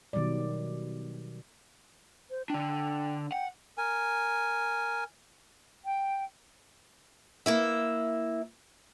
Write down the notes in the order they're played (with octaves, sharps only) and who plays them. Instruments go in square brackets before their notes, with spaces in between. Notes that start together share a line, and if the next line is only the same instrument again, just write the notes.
[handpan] B2 D#3 F#3 G3 D5
[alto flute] C5
[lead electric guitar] D3 D4 [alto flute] G5
[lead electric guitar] F#5 [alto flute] G5
[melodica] A#4 G#5
[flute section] G5
[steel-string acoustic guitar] A#3 E4 E5